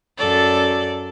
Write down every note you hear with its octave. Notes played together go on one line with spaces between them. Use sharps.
F#2 A4 D5